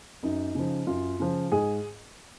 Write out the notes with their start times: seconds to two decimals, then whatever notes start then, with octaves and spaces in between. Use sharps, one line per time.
0.23 F#2 D#4
0.55 C#3 F3
0.87 F#2 F4
1.20 C#3 F3
1.52 G#2 G#4